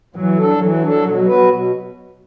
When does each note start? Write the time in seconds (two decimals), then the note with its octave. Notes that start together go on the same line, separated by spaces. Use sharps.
0.16 E3 F#3
0.38 D4 A4
0.60 E3 F#3
0.82 D4 A4
1.04 B2
1.27 B3 F#4 B4
1.50 B2